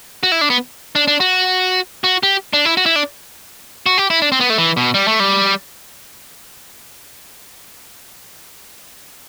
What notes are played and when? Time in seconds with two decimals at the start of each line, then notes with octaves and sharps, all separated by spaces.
0.23 F#4
0.32 E4
0.41 D4
0.50 B3
0.95 D4
1.08 D4
1.20 F#4
2.04 F#4
2.23 G4
2.53 D4
2.65 E4
2.77 F#4
2.86 E4
2.96 D4
3.86 F#4
3.98 G4
4.10 E4
4.22 D4
4.32 C4
4.40 B3
4.50 A3
4.58 E3
4.77 B2
4.94 G3
5.08 A3
5.20 G3